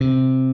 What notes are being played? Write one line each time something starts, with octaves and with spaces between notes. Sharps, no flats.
C3